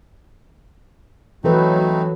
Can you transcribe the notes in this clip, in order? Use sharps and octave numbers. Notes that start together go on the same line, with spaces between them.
E3 F#3 A3 C4 D#4 A4 B4